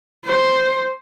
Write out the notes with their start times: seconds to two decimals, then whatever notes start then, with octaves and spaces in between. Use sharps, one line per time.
0.25 C5